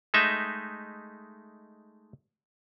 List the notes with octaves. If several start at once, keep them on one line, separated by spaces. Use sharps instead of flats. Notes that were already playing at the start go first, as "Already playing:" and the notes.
G#3 A3 D#4 E5